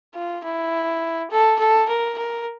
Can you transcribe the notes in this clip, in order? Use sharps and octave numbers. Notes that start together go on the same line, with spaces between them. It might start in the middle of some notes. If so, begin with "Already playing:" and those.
F4
E4
A4
A4
A#4
A#4